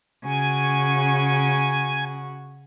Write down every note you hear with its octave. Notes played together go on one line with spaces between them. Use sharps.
C#3 F#4 G#5